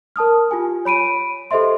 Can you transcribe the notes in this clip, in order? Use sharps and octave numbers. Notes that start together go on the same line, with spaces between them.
A#4 A5 D#6 F6
F4 G4 G#5
C#5 B5 D7 D#7
G4 A4 C5 D#5 E5 C6